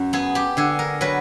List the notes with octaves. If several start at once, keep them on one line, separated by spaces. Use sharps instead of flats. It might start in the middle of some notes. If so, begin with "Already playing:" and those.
Already playing: F#2
B3 G#4
G4
D3 G#4
A#4
F#3 B4